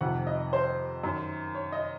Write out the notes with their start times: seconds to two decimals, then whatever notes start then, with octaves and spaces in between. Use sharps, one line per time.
0.01 F2 C3 D#3 F#5
0.27 D#5
0.53 C5
1.03 F#2 D#3
1.55 C#5
1.72 D#5